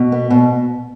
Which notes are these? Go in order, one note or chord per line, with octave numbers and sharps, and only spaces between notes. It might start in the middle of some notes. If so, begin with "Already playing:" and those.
Already playing: B2
B3
B2